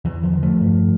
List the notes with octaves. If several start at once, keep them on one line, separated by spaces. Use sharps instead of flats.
E2 E3
D3 F3
D3
F3 A3
G2